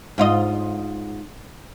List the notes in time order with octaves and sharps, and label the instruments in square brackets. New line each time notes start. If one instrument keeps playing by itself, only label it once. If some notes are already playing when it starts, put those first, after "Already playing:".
[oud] G#2 F4 D#5